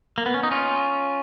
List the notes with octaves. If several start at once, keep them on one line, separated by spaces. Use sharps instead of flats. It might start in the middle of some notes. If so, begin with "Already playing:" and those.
A#3
B3
C#4
D#4
C#4 F4